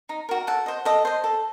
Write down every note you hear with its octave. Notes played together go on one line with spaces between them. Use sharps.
D#4
F#4 A#4
A4 F#5
C5 D#5
A4 D#5
C5 D#5
A4